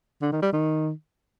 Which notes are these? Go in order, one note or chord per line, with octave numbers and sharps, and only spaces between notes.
D3
D#3
G3
D#3